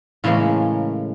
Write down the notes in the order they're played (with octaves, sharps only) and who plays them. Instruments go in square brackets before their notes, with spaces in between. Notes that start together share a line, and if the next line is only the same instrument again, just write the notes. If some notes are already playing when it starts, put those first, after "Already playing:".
[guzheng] A2 C#3 E3 G#3 A#3 C#4